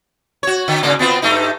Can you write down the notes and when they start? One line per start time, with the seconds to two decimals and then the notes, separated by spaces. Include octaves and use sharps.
0.43 F#4 C#5
0.68 D3
0.83 G#2 C#3 A#3
0.99 B3 C4 F4
1.22 G2 A3 D#4